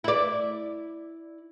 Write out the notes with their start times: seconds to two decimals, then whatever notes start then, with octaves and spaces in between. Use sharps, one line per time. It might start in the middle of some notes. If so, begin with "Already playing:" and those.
0.04 E4 D5